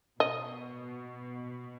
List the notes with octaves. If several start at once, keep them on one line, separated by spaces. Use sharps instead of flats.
B2 D#5